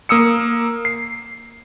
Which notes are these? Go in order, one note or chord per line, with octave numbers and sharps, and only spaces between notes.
A#3 D#6 E6 C#7
C7